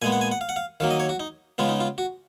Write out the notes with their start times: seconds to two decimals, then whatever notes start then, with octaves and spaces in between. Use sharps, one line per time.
0.02 A#2 G#3 B3 G#5
0.12 F#5
0.21 G#5
0.32 F#5
0.41 F5
0.49 F#5
0.56 F5
0.80 D#3 F#3 A#3 F5
0.90 D#5
1.00 C#5
1.09 F#4
1.20 D#4
1.58 C#3 G#3 B3 F4
1.69 D#4
1.80 F4
1.98 F#4